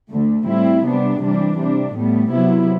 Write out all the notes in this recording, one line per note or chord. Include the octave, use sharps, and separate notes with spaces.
D2 D3 A3
A2 G3 C4 E4
C3 G3 B3 D4
C3 E3 G3 D4
C3 G3 D4
A2 G3 B3
C3 F#3 B3 E4